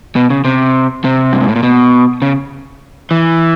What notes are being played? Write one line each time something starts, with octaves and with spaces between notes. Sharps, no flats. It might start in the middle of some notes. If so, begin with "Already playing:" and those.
B2
C#3
C3
C3
G2
G#2
A2
A#2
B2
C#3
E3